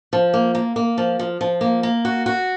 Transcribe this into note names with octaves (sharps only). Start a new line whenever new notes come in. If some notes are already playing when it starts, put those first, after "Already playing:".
F3
A#3
A#3
A#3
F3
F3
F3
A#3
A#3
F#4
F#4